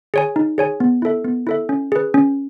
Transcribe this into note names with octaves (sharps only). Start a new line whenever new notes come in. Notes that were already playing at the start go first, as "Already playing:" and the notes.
G#4 C#5 G#5
D#4
G#4 C#5 G#5
B3
E4 A4 E5
B3
E4 A4 E5
C#4
G#4 B4
C#4